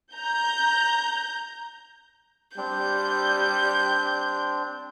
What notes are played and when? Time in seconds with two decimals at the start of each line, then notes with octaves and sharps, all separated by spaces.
0.14 A#5 G6
2.57 G3 C4 D4 G6